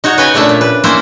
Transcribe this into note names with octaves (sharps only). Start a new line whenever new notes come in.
D#4 F#4 C#5 F#5
C#3 B4 C#5 G5 G#5 A#5
A#2 C#3 A3 D4 E5 A5
A#2
B4
A#3 C4 C#4 E4 C5